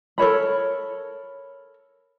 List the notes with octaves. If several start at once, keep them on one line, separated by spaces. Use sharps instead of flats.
A4 A#4 C#5 B5